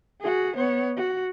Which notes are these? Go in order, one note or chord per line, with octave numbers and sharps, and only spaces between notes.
F#4 G#4
B3 C#5
F#4